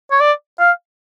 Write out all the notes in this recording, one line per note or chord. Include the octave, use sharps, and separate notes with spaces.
C#5
D5
F5